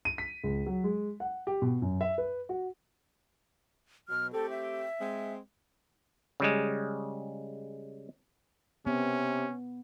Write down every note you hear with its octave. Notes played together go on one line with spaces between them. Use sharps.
D#7
B6
C#2
F#3
G#3
F#5
G4
B2
F#2
E5
B4
F#4
B2 F#3 F6
A3 C4 G4 A4
E5
G#3 C4
C#3 G3 G#3
C3 B3 C#4